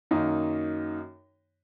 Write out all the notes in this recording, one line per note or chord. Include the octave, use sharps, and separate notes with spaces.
F#2 D#3 A#3 D#4